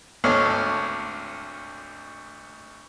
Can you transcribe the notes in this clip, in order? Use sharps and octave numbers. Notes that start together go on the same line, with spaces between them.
G#1 D2 D3 C#5 F6